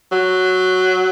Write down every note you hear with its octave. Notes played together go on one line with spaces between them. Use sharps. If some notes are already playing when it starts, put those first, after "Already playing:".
F#3